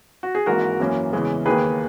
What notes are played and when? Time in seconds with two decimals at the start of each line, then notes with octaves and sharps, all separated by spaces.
0.23 F#4
0.35 G#4
0.46 G#1 G#2 E3 A#3 F#4 A#4
0.80 F#2 E3 A#3 C#4
1.13 E2 C#3 E3 G#3
1.46 D#2 D#3 A#3 G#4 B4